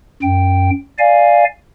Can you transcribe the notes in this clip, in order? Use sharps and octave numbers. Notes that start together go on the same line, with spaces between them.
F#2 G5
D5 F5 G#5